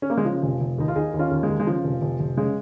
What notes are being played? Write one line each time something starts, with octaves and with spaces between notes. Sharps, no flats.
C#4
A#3
G#3
C#3 F3
F1
F1
D#2 D#4
F4
D#2 D#4 G#4
D#2
C#4 F4
D#2
G#3
D#2
G#3
C#3 F3
F1
F1
F1
C#3 G#3